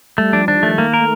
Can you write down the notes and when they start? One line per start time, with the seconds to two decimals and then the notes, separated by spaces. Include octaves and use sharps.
0.18 G3 A3
0.33 F3 D4
0.48 D#3 D4
0.63 A3
0.78 A#3
0.94 A#4
0.99 A3